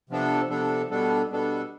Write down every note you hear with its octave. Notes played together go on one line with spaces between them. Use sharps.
C3 F3 B3 D4 A4
C3 F3 B3 D4 A4
B2 G3 B3 D4 A4
B2 G3 B3 D4 A4